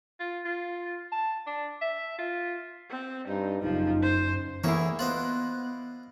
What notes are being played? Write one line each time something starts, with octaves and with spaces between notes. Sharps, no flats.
F4
F4
A5
D4
E5
F4
C4
G2 D#4
F#1 F3 D#4
C5
D2 E3 A#3 E4 G#4 C#5
B3 F4 C5 D#5 F#6